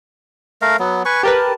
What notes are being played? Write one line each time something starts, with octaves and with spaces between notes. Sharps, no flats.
A3 A#4 F5
F#3 B3
B4 G#5 C#6
G4 A#4 B4 A5